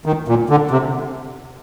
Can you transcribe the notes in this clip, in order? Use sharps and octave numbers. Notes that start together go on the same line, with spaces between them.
D#3
A#2
D3
C3